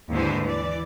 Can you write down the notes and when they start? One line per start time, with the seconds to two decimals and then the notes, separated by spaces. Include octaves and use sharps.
0.11 D#2 G#2 D3 E3 B4 C5
0.43 E3 D5